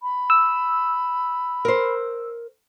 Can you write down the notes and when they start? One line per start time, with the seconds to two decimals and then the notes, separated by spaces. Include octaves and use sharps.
0.03 B5
0.30 E6
1.65 A#4 C5